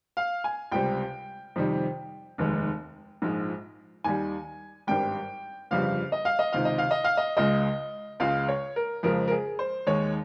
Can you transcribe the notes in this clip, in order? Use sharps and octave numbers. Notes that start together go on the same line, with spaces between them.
F5
G#5
C#2 C3 G3 G5
F2 C3 D#3 G3
F1 D#2 D#3 G#3
A#1 G#2 F3 G#3
D#2 D#3 G3 G#5
G#1 G2 G3 G5
G1 F2 C#3 G3 F5
D#5
F5
D#5
C#2 C3 D#3 F5
D#5
F5
D#5
F5
D#5
C#2 C#3 G#3 D#5
C#2 C#3 G#3 F5
C#5
A#4
F2 C#3 F3 G#3 A#4
A#4
G#4
C5
D#2 D#3 G#3 C#5